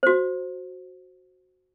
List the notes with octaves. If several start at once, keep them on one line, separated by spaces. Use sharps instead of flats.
F#4 C5